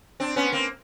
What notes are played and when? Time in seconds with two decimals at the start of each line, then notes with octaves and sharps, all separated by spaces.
0.20 C4 D4
0.36 B3 C#4
0.52 A#3 C4